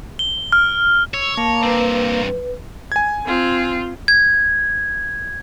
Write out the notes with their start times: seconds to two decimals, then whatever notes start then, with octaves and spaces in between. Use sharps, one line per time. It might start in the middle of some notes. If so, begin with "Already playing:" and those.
0.19 G7
0.52 F6
1.14 C#5 E6
1.37 A#3 A5
1.63 G2 C4 B4
2.92 G#5 G#6
3.26 C4 F4
4.08 G#6